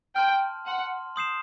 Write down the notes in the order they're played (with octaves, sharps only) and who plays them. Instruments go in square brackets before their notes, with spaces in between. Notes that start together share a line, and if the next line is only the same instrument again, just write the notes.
[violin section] G5 [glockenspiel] A5 C6 F6
[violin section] F#5 [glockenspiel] A5 C6 F6
[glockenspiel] C6 D#6 G6 C7 E7